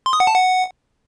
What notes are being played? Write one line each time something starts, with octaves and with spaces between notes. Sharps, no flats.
C6
D#6
F#5
A5
F#5